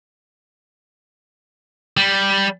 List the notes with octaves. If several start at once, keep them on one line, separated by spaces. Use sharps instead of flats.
G3